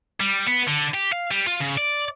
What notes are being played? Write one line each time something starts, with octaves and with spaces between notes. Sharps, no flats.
G3
B3
D3
G4
F5
G3
F4
C#3
D5